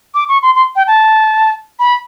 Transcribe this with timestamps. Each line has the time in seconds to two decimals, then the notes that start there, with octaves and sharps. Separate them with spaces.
0.15 D6
0.29 C#6
0.42 C6
0.55 C6
0.76 G5
0.87 A5
1.79 B5